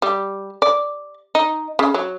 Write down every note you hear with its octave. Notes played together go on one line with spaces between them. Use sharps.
G3
D5
D#4
C#3
F#3